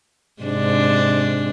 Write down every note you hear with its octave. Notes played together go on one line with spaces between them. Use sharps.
G#2 C3 D4